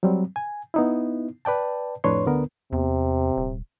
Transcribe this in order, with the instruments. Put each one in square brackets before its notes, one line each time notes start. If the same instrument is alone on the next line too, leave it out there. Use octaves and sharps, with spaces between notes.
[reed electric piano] F#3 G3 C4
G#5
B3 D#4 E4
B4 D5 G5 A5
F2 A2 D4 B4 C#5 C6
D2 D3 B3 A#4
[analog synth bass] E2 [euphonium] C3
[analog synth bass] D#1